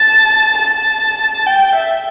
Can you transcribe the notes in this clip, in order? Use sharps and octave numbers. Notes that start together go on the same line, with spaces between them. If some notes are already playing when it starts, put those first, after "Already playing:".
Already playing: A5
A5
G5
E5